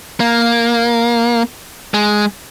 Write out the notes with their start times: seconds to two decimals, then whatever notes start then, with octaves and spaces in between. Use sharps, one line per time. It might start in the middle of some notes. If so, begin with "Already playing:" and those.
0.20 A#3
1.94 G#3